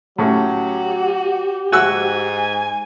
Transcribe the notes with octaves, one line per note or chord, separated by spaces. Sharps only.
A2 F#3 C#4 F#4 G4
G#2 F#4 G#5 E6 F#6